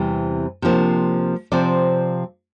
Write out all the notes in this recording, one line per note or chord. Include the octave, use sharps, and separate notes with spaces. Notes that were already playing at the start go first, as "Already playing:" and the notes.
Already playing: E2 C3 E3 G3 C4
C3 F3 A#3 D4
C3 F3 C4 D5